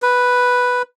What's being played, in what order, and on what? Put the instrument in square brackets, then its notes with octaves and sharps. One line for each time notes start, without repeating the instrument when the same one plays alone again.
[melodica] B4